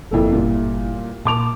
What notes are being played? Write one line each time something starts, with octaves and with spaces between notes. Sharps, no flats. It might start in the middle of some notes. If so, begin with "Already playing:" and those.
G1 F2 A#3 E4 A4
A#2 G3
A#2 A#3 A5 D6 F7